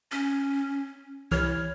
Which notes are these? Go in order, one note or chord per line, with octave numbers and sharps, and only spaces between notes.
C#4
C2 E3 C#5 F6